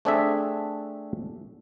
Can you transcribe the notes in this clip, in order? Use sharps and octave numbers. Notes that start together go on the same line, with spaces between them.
A3 C4 D4 G#4 A4 E5